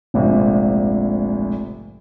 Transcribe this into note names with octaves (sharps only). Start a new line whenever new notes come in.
F1 A#1 G#2 C3